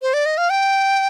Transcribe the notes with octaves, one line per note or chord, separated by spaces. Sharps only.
C5
D5
D#5
F5
G5